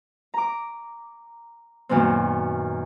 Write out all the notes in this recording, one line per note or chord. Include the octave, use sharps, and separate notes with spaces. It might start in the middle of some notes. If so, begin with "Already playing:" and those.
A#5 D6
F#2 A#2 D#3 B3 C4